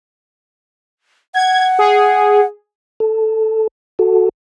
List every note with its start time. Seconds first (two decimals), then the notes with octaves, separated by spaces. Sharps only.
1.34 F#5 G#6
1.79 G#4
3.00 A4
3.99 F#4 A4